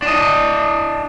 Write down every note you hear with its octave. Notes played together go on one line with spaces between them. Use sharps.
D4 D#5